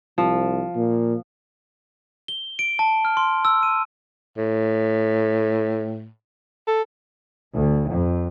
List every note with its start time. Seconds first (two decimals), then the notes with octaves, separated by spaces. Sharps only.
0.18 C2 F3
0.75 A#2
2.28 G7
2.59 D7
2.79 A5
3.05 F6
3.17 C6
3.45 E6
3.63 D#7
4.38 A2
6.68 A4
7.53 D2
7.88 F2